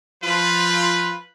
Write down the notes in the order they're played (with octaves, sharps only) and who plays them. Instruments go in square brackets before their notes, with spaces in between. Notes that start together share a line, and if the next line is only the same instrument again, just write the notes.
[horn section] F3 F4 [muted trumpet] B4